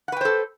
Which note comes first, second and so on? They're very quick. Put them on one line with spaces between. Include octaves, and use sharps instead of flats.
F#5 B4 G5 C5 A4